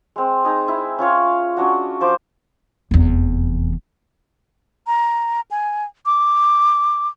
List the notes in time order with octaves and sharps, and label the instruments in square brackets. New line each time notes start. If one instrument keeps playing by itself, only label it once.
[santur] G#3 C4
D#4 G#4
E4
C#4 F4 C#5 F5
F#3 C#4 D4 F#4
F3 C5 D6
[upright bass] F1 E2
[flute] A#5
G#5
D6